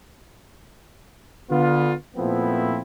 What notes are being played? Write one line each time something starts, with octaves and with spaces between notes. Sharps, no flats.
D3 B3 F4
A#2 F3 A3 B3 C4 E4